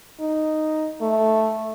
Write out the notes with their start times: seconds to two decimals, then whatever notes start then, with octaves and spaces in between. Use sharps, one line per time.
0.21 D#4
1.01 A3